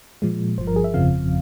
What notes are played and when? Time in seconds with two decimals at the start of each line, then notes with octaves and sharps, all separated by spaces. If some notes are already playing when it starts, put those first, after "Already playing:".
0.22 A#2 F3 G#3
0.58 G1 G2 F3 C5
0.67 A#4
0.76 G#4
0.84 E5
0.94 G1 F2 C#3 F3 C4 F5